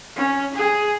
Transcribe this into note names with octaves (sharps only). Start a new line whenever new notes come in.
C#4
G#4